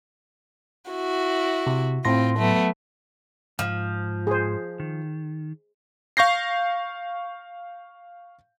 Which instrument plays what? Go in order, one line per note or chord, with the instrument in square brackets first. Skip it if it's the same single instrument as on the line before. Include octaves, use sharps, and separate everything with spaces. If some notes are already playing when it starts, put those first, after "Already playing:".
[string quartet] E4 F#4
[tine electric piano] C3
[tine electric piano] A2 C6 A#6 [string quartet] C4 F4
[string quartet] F#3 A3 B3
[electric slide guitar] G#2 [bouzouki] F3
[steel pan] G#4 C5
[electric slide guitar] D#3
[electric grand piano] F5 C#6 G6 A#6 C7